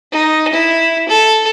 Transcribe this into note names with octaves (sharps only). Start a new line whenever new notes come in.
D#4
E4
A4